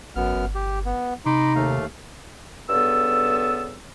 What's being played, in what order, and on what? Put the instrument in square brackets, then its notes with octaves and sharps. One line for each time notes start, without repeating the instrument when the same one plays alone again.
[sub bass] G#1 [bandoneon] F#2 B3 F6
[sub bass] G1
[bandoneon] G4
B3
[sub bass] C3 [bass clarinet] D#4 [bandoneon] B5 C6 D6
[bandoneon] D#2 A3 F5
[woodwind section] G2 C#3 B3 A4 E6